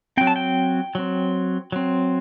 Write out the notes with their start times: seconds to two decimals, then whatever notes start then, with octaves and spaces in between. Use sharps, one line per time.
0.17 F#3 C4 G5
0.27 A5
0.36 G5
0.95 F#3 C4
1.72 F#3 C4